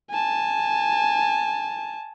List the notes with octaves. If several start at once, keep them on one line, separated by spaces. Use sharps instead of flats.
G#5 A5